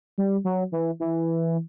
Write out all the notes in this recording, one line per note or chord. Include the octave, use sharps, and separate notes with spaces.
G3
F#3
E3
E3